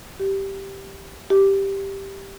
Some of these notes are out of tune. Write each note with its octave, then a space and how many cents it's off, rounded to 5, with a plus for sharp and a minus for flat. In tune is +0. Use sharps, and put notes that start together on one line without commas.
G4 -5
G4 +0